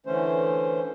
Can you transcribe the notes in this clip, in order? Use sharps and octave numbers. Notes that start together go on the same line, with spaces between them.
D3 E3 A3 C#4 C5